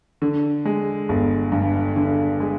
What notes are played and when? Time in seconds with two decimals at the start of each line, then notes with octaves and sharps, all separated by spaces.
0.22 D3
0.65 G#3
1.09 G1
1.52 G2
1.96 D3
2.40 G#3